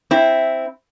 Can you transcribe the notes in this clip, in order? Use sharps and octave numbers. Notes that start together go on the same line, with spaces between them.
C4 E4